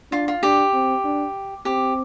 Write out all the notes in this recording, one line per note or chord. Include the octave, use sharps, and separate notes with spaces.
D4 F4
F4
D4 G4
C4
D4
C4 G4